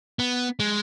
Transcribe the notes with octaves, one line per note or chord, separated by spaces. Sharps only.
B3
G#3